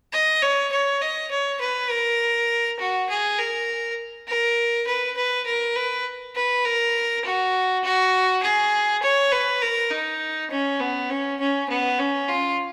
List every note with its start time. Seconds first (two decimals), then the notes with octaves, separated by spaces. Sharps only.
0.13 D#5
0.42 C#5
0.72 C#5
1.02 D#5
1.31 C#5
1.61 B4
1.91 A#4
2.79 F#4
3.09 G#4
3.39 A#4
4.28 A#4
4.87 B4
5.17 B4
5.46 A#4
5.76 B4
6.35 B4
6.65 A#4
7.24 F#4
7.84 F#4
8.43 G#4
9.02 C#5
9.32 B4
9.62 A#4
9.91 D#4
10.51 C#4
10.80 B3
11.10 C#4
11.40 C#4
11.69 B3
11.99 C#4
12.28 F4